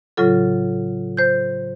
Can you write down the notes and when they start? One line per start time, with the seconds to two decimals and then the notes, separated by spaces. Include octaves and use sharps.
0.17 A2 C#3 F#3 F4 A4
1.17 C5 G6